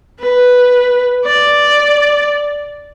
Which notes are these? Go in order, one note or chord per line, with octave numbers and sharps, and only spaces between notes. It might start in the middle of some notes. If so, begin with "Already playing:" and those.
B4
D5